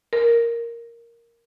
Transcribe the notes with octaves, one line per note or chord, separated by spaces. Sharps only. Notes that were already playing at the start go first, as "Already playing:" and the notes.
A#4